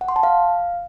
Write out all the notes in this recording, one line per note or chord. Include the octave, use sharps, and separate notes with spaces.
F#5
C6
A5
F5